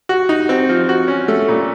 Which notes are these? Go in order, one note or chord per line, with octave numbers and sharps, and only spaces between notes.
F#4
D#4
C4
F3
F#4
C#4
A3
A#2